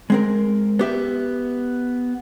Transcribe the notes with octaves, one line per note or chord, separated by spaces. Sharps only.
G#3 C4 A#4
B3 G4 E5